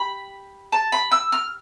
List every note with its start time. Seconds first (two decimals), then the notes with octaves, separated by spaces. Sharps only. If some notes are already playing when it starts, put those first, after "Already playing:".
Already playing: G4 B5
0.72 A5
0.92 B5
1.11 E6
1.32 F6